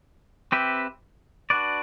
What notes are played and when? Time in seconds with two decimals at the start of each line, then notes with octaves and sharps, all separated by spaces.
0.52 C4 G4 B4 E5
1.50 D4 F#4 B4 D5